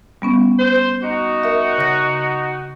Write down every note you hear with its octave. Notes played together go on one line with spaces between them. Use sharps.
G3 B3 C#4
C5
D#4 F#4
A#4 E5
C#3 A#6